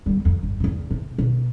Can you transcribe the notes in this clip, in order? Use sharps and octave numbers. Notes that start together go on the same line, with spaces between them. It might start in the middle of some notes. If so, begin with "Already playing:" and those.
G3 B3
F2
G1
E2 C3
C3
B2